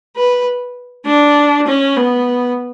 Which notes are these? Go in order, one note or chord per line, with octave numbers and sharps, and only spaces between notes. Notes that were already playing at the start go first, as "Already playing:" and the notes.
B4
D4
C#4
B3